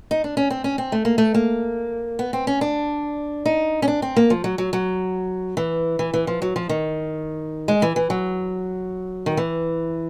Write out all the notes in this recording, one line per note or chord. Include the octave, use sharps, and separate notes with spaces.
D#4
D4
C#4
C4
C#4
C4
A3
A#3
A3
A#3
B3
C4
C#4
D4
D#4
C#4
D4
C4
A#3
F3
F#3
F#3
F#3
E3
E3
E3
F3
F#3
F3
D#3
G#3
E3
E3
F#3
D#3
E3